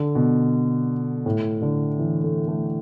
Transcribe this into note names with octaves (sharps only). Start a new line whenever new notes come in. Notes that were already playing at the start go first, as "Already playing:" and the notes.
Already playing: D3
B2
A2
D3
E3
A3
A3